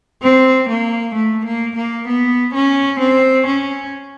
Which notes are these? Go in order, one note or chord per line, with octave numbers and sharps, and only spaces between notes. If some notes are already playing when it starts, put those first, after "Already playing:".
C4
A#3
A3
A#3
A#3
B3
C#4
C4
C#4